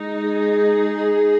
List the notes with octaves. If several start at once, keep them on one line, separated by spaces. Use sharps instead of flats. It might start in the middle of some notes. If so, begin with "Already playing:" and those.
Already playing: G#3 D#4
G#4